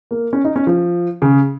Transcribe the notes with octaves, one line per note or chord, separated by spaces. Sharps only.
A#3
C#4
D#4
C#4
F3
C#3